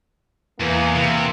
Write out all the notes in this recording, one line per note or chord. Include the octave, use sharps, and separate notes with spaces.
E2 E3 A#3
C3